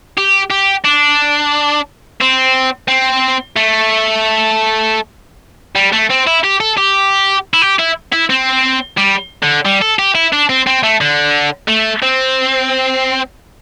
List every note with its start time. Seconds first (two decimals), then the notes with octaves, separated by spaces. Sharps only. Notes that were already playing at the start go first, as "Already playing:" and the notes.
0.18 G4
0.51 G4
0.85 D4
2.21 C4
2.88 C4
3.56 A3
5.75 G3
5.92 A3
6.10 C4
6.27 E4
6.44 G4
6.60 A4
6.77 G4
7.54 E4
7.62 G4
7.79 E4
8.13 E4
8.30 C4
8.97 G3
9.42 D3
9.65 G3
9.82 A4
9.99 G4
10.15 E4
10.33 D4
10.49 C4
10.67 C4
10.83 A3
11.01 D3
11.68 A3
12.03 C4